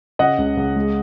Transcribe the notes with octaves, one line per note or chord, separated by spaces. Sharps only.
C#3 D#5 F#5
C#2
C#2
G#3